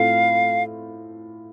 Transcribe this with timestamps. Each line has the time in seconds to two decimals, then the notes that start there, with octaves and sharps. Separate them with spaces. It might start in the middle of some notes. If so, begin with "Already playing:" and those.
Already playing: A2 A3 C4 F4 F5